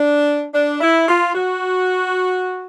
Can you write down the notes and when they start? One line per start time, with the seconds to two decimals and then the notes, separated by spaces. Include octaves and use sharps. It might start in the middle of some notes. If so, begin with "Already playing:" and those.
Already playing: D4
0.54 D4
0.81 E4
1.07 F4
1.34 F#4